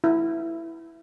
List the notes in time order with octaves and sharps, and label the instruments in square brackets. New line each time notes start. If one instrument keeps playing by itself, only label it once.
[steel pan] E4